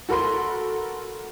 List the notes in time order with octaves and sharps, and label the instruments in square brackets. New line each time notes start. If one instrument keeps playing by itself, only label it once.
[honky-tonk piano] F#4 A4 A#4 B5 C6